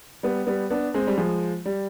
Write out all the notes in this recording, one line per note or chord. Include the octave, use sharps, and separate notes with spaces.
G3 B3
G3 B3
B3 D4
G#3 C4
G3
F3 G#3
G3